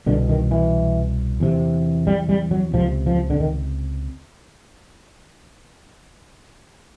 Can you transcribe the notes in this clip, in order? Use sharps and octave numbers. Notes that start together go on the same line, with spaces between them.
C2 B2 D3
D#3
E3
E2 C3
G3
G3
F#3
C#2 C3 F3
F3
D3
D#3